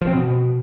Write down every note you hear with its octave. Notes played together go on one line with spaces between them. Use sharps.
F3
C4
B2